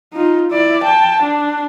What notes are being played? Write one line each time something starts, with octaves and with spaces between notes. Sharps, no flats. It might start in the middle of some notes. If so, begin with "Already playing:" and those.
D#4 F4
E4 D5
G5 A5
D4